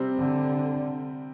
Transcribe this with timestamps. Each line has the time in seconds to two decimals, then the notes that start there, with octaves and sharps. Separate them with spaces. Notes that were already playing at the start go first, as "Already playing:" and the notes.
Already playing: C3 G3 C4
0.17 D3